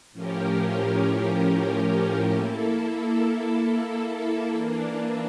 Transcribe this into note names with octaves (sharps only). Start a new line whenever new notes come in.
A2 F3 C#4 G4 A#4
A#3 E4 A4
E3 A#3 D4